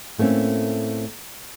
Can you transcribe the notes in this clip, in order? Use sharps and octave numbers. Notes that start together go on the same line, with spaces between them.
A2 A3 A#3 C4 C#4